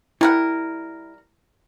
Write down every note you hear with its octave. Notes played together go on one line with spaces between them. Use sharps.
G3 E4 A#4 F#5